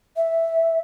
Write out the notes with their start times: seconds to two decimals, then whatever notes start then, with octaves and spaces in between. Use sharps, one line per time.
0.16 E5